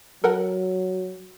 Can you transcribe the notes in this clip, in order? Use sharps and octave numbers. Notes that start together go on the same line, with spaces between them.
F#3 A4 A#4 F#5